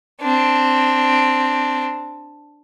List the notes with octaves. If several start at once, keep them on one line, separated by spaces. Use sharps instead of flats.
C4 D4